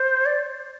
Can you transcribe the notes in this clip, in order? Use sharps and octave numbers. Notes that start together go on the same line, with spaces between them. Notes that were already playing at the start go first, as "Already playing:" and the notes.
Already playing: C5
D5